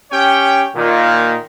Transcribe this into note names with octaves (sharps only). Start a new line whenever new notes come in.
C#4 G4 C#5 G5
A#2 D#3